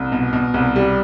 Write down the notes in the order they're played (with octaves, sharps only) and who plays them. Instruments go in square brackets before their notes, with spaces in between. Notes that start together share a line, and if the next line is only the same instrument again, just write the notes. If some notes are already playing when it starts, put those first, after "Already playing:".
Already playing: [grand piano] C2
B2
B2
C2
G3